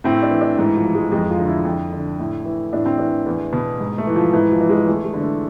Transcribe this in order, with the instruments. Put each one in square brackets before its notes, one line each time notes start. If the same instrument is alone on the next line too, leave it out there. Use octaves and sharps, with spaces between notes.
[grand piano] A2 C4
D4
E3
D4
G#2 E3
F3
E3
G#3
F2 G#3
F4
D3
E4
F2
D3
A2
E3
A2 D4
C4
E3 D4
E2
B2
G#2
A3
E3
F3
G#2 E3
F3
E3
G#3
E2 A3
G#3
D3
A3